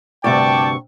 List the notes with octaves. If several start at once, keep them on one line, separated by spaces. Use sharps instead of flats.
D2 G2 C3 D5 G5 A5 C#6